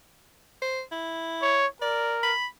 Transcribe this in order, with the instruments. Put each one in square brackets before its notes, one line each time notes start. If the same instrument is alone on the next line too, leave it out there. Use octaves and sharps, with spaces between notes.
[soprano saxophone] C5
E4
[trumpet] C#5
[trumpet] A#4 [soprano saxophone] D5
[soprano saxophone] B5